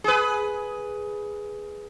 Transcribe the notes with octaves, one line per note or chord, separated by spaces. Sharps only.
G#4 B4